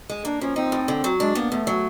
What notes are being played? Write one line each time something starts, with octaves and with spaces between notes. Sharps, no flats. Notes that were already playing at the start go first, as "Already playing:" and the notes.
G#3
A#3 D4
F3 C#4
C4 D#4
A2
D3
F#3
G#3 D4
A#3 B3
E2 A3
F#3